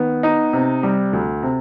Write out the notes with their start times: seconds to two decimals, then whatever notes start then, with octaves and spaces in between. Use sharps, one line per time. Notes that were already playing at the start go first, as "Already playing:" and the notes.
Already playing: D#3 B3
0.23 D#4
0.53 C3
0.83 G3
1.13 D2
1.43 C3